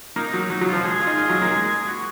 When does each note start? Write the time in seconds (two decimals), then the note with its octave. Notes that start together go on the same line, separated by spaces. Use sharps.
0.16 A#3 D#4
0.27 D#4
0.33 F#3
0.39 D#4
0.50 F#3 D#4
0.61 F#3
0.67 F4
0.73 F3
0.84 G#3 G#4
1.02 F4
1.07 D#4
1.18 F4
1.29 F#3
1.42 A#3
1.53 G#3
1.87 F#4